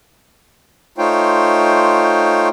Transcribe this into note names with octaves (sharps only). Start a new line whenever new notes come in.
A3 D#4 F4 C5 C#5 G5